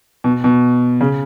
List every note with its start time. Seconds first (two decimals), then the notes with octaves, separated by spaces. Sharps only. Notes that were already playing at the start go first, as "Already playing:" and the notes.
0.24 B2
0.44 B2
1.01 C#3